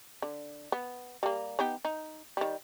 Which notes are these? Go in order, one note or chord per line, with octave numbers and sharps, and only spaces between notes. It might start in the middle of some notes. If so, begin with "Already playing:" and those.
D3
B3
G3 A#3
B3 D#4 G4
D#4
D#3 G3